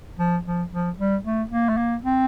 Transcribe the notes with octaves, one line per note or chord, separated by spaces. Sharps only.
F3
F3
F3
G3
A3
A#3
A3
A#3
C4